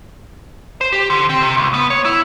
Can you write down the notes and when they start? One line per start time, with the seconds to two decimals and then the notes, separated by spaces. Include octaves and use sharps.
0.81 C5
0.93 G4
1.10 D3
1.29 C4
1.43 C3
1.57 C#2
1.74 B3
1.90 C#5
2.05 E4